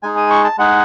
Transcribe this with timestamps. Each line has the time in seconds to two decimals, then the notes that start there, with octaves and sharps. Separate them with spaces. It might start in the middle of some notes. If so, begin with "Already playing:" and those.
0.03 G#3 D#4 G#4 G#5
0.17 D#6
0.30 C#6
0.44 A5
0.58 G#3 D#4 G#4 F#5